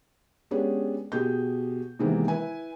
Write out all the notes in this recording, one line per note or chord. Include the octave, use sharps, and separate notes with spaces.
G#3 B3 C#4 D4 G4 G#4
B2 G4 G#4 G6
C3 D#3 E3 G#3 A#3 B3
E4 B4 G#5